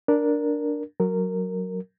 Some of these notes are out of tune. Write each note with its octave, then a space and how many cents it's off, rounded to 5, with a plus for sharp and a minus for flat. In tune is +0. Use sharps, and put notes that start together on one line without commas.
D4 +0 A#4 +0
F#3 +0 A#4 -15